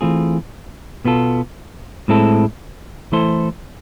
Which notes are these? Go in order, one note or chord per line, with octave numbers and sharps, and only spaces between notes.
E3 A3 C4 F4 G#4
B2 B3 F4 A4
A2 G#3 C4 E4 A4
E3 A3 E4 A4 C5